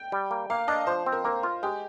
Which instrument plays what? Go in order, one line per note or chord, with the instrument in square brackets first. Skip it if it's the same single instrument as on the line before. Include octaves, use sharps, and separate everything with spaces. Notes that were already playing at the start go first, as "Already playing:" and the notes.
Already playing: [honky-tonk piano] G5
[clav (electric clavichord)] G3
A#3
[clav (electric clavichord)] A#3 [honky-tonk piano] F5
[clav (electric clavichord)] D4 [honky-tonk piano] D#5
[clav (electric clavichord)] F3 [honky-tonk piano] C5
[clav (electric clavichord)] C4
[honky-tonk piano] A#4
[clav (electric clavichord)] A#3 [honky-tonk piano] A#4
[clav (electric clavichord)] F4
[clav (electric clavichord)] G#3 [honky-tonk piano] G4